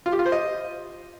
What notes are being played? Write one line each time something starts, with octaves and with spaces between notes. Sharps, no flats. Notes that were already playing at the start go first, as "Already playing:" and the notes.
F4
G4
F4
C5
D#5